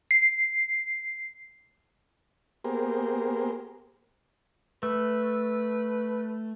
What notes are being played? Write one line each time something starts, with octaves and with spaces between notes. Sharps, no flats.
C7
A#3 B3 G4 G#4 A#4 C5
A3 B4